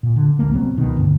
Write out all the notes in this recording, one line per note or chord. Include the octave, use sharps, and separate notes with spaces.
A#2
D3
A1 D2 G#3 A#3
C2 F#3 B3 C4
C#2 B2 D#3
F#1 D2 G2 D3